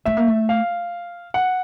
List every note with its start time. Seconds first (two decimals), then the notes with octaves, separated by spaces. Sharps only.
0.05 A3 E5
0.17 A#3
0.28 A3
0.49 F5
1.34 F#5